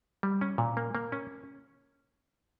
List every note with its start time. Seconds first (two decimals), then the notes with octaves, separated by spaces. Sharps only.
0.23 G3
0.41 C#4
0.58 A#2
0.77 A#3
0.95 A#3
1.12 C#4